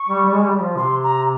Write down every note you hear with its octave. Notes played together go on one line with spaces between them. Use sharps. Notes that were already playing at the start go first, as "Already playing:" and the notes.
Already playing: C#6
G3
G3
G#3
G3
G3
F3
C3 C6
A#5